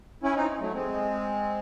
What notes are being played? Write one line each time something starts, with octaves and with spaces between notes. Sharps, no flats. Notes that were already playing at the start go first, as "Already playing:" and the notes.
C#4 E4
C4 D#4
F#3 A3
G#3 C4